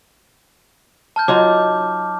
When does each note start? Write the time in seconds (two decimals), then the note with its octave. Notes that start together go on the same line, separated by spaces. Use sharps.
1.16 A5 F6 G6
1.28 F#3 D#4 F4 A5 D6